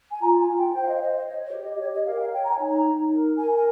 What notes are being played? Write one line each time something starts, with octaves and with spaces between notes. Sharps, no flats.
G#5
F4 A#5
G#5
F4
G5
C5 G5
F5
D#5
F5
C5 D#5
C#5 D#5
C#5
G4
D#5
D#5
G4 C#5
D#5
A#4 F5
G5
F5
C#5 G5
A#5
G#5
D#4
A#5
D#4
A#4
A#4 G#5
G#5